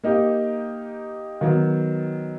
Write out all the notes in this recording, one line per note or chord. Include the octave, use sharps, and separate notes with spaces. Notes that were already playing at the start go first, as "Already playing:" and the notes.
A#3 D#4 G4
D#3 F#3 B3